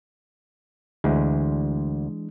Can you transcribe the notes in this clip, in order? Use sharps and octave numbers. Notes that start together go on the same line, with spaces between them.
D2 E3 G#3 D4